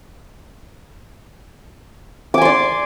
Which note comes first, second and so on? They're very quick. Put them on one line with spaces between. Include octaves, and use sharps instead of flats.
D6 G#5 C6 D5